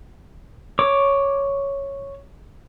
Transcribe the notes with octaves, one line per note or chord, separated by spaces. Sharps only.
C#5 D6